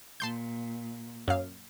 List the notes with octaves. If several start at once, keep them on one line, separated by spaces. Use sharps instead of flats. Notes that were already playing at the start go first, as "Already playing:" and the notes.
A#2 A5 C6 G6
F#2 F5